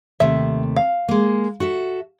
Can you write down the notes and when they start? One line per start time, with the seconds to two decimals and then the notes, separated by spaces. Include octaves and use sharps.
0.20 D#2 C3 A3 E5
0.76 F5
1.08 G#3 A#3
1.60 F#4 A4 E5